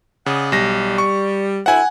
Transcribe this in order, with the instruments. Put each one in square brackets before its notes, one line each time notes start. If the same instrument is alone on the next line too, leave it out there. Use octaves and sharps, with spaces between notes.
[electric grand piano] C#3 [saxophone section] D5 D#5 F#5
[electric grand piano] B1 A#6 [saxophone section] G3
[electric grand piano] C#6
[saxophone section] D2 E4 C5 [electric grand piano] F#5 G#5